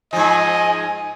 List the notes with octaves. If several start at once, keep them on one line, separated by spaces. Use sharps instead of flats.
G#2 F3 D#5 G#5